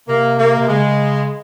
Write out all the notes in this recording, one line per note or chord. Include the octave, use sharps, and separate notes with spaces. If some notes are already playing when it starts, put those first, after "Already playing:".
C3 A#3
A#3
C3
C#3 G#3